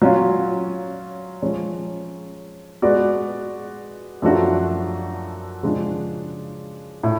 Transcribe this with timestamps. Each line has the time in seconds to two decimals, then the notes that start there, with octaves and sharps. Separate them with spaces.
0.02 F#3 C#4 F4
1.42 F3 G#3 C#4
2.82 G#3 B3 F#4 B4 D5
4.22 F#2 F3 A3 D4 F#4
5.63 C#3 F3 G#3 D4
7.03 A2